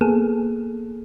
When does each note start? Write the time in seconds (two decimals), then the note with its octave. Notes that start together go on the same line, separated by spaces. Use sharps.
0.01 A#3 B3 G#4 A4